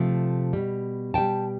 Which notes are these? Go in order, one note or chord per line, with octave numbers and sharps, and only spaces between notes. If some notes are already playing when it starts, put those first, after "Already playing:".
Already playing: C3 F3 A3
B2 G3
B2 G3 G5 A5